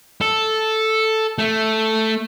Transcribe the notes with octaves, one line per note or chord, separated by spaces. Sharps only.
A4
A3